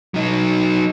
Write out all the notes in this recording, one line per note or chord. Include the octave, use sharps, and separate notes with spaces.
F#3 D#4